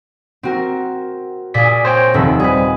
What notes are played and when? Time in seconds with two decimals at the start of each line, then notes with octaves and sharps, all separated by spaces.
0.43 C4 F#4 A#4
1.54 A#2 G#4 D5 B6
1.85 C5 C#5 G5 A#6
2.14 D#1 F2 C3 D#3 A4 B4
2.40 G3 C4 G#4 B4